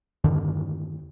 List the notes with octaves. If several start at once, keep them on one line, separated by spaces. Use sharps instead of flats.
E2 G2 D3 D#3